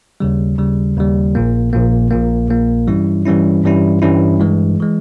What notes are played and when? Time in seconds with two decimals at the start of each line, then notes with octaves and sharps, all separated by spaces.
0.20 D#2 C#3 G3
0.58 D#2 C#3 G3
0.97 D#2 C#3 G3
1.35 A#1 A#2 A#3
1.73 A#1 A#2 A#3
2.11 A#1 A#2 A#3
2.49 A#1 A#2 A#3
2.87 G2 E3 G3 C#4 E4
3.25 G2 E3 G3 C#4 E4
3.64 G2 E3 G3 C#4 E4
4.02 G2 E3 G3 C#4 E4
4.40 G2 E3 G#3
4.80 E3 G#3